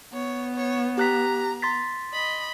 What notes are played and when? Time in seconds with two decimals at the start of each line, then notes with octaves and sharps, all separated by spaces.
0.13 B3 C#5
0.56 C#5
0.98 G4 A#5 F#6 B6
1.62 C6 A6 B6
2.13 D#5 B5